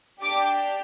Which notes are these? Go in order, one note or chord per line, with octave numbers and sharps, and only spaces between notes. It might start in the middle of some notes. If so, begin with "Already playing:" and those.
D4 G4 D6